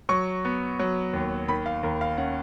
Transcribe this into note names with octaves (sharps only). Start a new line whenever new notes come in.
F#3 C#6
B3
F#3
D#2
D#3 B5
F5
D#2 A#4
F5
C#4 F#5